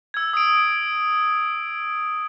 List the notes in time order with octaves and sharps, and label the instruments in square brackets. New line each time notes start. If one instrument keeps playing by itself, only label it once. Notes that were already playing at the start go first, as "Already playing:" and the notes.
[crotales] E6 G#6
D#6 D7